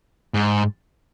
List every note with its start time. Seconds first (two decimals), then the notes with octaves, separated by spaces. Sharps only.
0.34 G#2